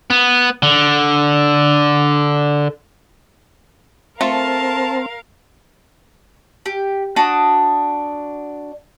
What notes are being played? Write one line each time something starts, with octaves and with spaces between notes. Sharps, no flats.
B3
D3
A3 C4 F4 A4 A#4 F5 A5
G4
D4 F#4 D#6